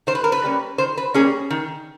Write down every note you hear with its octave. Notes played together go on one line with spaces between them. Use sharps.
D#3 C5
B4
A#4
B4
G3 A#3 C#4
D#3 C5
B4
G3 A#3 C#4 G#4
D#3